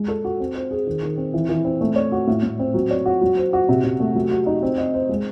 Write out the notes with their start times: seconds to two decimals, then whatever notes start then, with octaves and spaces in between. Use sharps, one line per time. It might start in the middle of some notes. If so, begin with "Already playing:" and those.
Already playing: G#3
0.08 A4
0.25 F#4
0.40 C4
0.55 C5
0.71 G#4
0.87 D#3
1.03 D#3
1.17 C4
1.34 E3
1.49 E3
1.65 C4
1.81 A3
1.96 C#5
2.12 F#4
2.27 A2
2.43 A2
2.59 C4
2.74 F#3
2.91 C#5
3.06 F#4
3.21 F#3
3.37 C5
3.53 F#4
3.69 C3
3.84 C3
4.00 A3
4.15 F#3
4.31 F#4
4.46 D#4
4.63 C4
4.78 D#5
4.94 C5
5.09 G#3